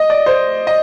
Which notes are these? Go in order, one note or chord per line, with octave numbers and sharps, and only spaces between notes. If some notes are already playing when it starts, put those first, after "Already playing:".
Already playing: D#5
D5
C5
D#5